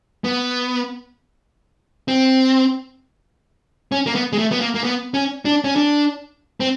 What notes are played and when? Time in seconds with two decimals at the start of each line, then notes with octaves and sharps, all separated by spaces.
0.24 B3
2.08 C4
3.92 C#4
4.06 A#3
4.15 B3
4.33 G#3
4.38 A3
4.51 B3
4.61 A#3
4.75 A#3
4.84 B3
5.14 C#4
5.45 D4
5.64 C#4
5.76 D4
6.60 C4